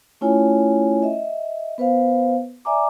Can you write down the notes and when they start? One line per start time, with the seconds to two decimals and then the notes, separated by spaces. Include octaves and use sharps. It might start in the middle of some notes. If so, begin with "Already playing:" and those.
0.21 A3 C#4 E4 F4 C#5 G#5
1.03 D#5 E5
1.78 B3 B4 C5 F5
2.65 D5 E5 G#5 A#5 D6